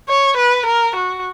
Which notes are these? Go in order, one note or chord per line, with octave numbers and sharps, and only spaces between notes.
C#5
B4
A#4
F#4